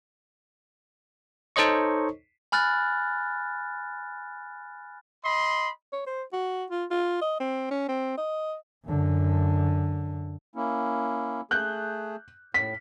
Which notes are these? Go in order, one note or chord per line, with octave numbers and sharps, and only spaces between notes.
D#4 A4 C5 C#5 D#5 C#6
G#5 B5 F6 F#6 A6
D#5 B5 C6
C#5
C5
F#4
F4
F4
D#5
C4
C#4
C4
D#5
F#2 D3
A#3 C#4 E4
A3 G#4 F#6 G6
A2 B6